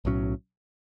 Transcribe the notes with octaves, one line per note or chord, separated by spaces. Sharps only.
B1 A2 F#3 C#4